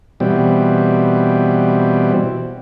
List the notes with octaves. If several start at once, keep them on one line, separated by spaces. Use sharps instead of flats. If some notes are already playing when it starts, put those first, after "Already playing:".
B2 E3 G3 C4